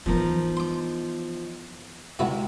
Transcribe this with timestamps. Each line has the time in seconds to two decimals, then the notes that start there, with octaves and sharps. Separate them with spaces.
0.06 E3 F3 B3 D#4 A#4
0.57 C6 D6
2.19 C#2 C3 E4 F#4